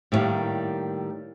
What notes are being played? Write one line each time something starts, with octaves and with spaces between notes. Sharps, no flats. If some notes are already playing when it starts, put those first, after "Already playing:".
A2 D3 D#3 G3 A#3